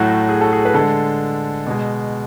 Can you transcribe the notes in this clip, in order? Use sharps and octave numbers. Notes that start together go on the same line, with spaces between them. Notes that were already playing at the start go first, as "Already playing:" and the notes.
Already playing: A2 F#3 A3 F#4
G#4
A4
G#4
B4
D3 G#3 A4
B2 G#3